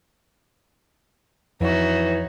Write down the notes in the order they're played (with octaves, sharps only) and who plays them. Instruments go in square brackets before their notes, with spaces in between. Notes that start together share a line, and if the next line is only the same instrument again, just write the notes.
[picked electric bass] F2 [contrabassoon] E3 [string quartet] D#4 F#4 E5 [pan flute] C#5